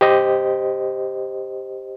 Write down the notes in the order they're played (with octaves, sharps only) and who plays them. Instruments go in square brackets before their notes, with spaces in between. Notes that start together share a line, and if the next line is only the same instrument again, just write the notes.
[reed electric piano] G4 C5 D#5